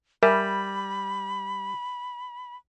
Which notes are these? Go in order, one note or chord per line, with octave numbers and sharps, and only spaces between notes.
G3 A#4 E5 G#5 B5